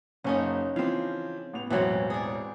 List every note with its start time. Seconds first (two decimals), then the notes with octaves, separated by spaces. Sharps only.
0.24 F#1 C#3 C#4 D#4
0.76 E3 F3 C4 F5
1.53 A1 B3 F7
1.70 E1 A1 E3 F#3 C4
2.10 G#4 D5